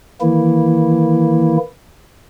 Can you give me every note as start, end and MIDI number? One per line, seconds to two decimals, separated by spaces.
0.21 1.57 51
0.21 1.57 52
0.21 1.57 58
0.21 1.57 64